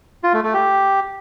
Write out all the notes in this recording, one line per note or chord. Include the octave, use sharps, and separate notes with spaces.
F4
A3
A3
G4